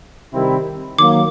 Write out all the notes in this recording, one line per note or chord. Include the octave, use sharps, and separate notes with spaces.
C3 D#3 G3 C4 E4
D#3 F#3 A#3 D6